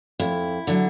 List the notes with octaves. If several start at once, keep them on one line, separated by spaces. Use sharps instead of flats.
F2 E4
D3 F#3